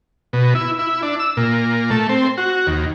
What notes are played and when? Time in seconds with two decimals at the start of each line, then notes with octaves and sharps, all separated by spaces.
0.33 B2
0.55 E4
0.79 E4
1.02 D4
1.19 E6
1.37 A#2
1.90 A3
2.09 C4
2.38 F#4
2.67 D#2